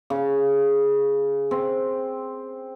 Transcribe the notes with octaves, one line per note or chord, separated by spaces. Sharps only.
C#3
C4